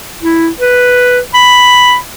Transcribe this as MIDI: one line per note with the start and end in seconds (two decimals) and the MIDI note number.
0.23 0.49 64
0.60 1.19 71
1.34 1.96 83